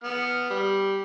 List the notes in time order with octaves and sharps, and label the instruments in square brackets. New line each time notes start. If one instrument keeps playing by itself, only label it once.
[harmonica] B3 F6
G3